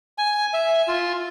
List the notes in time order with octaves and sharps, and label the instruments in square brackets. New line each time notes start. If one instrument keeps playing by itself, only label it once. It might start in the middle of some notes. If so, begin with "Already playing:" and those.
[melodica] G#5
E5
F4